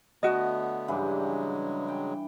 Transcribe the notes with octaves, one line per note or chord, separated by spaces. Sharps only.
D3 A3 B3 F#4 D#5
G2 C#3 E3 F#3 G#3
G5